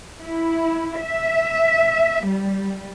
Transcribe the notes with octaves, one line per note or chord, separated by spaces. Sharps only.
E4
E5
G3